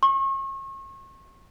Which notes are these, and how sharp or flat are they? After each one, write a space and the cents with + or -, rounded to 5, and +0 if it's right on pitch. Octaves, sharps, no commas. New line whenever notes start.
C#6 -35